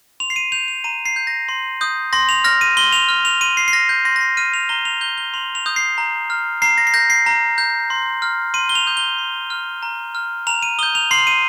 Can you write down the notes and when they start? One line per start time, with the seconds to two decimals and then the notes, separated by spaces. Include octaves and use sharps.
0.20 C6 F7
0.30 C7
0.36 D#7
0.52 G6 F7
0.68 F7
0.84 A#5 D#7
1.06 C7
1.16 G6
1.27 A#6
1.49 C6
1.81 D#6 G6
2.13 C6 A#6
2.29 F7
2.44 F6 A#6
2.61 D#7
2.77 C6 G7
2.93 F7
3.09 F6
3.25 F7
3.41 C6 D#7
3.57 C7
3.68 C7
3.73 F6 A#6
3.89 G6
4.05 C6 A#6
4.16 A#6
4.21 C7
4.37 F6 D#7
4.54 F7
4.69 A#5 G7
4.85 F7
5.01 G6 G7
5.18 G7
5.34 C6 F7
5.55 F7
5.66 D#6 G6
5.76 C7
5.98 A#5
6.30 F6
6.62 A#5 C7
6.78 A#6
6.87 C7
6.94 G6 A#6
7.10 C7
7.26 A#5
7.58 G6
7.90 C6
8.22 F6
8.54 C6 D#7
8.69 G7
8.75 F7
8.87 D#6 G6
8.97 G7
9.18 C6
9.50 F6
9.83 A#5
10.15 F6
10.47 A#5 F7
10.62 D#7
10.79 D#6 G6 G7
10.95 F7
11.11 C6 C7
11.27 D#7